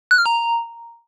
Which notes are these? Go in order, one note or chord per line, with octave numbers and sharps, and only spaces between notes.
F#6
F6
A#5